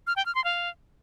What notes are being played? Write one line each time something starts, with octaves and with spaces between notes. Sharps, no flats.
F6
G5
F6
C6
F5